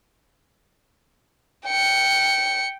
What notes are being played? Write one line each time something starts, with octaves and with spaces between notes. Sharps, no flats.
G5 C#7